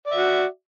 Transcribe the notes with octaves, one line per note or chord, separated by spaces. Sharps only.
F#4 D5 E5